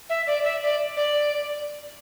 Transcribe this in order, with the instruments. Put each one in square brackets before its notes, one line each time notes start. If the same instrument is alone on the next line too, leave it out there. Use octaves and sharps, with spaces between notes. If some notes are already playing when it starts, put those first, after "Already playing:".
[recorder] E5
D5
E5
D5
D5